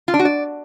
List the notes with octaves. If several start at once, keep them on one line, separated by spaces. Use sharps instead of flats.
F4
D4
F#4
D5